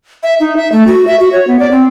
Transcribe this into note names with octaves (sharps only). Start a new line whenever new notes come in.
E5
D#4
E5
A3
F#4
E5
F#4
C#5
B3
D5
C4